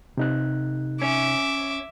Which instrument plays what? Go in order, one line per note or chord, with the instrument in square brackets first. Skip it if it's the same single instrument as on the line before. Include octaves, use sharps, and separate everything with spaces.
[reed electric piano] C3 D#4 F#6
[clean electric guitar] C#4 [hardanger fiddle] E5 D6